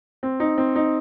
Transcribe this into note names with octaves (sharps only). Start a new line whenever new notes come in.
C4
D#4
C4
D#4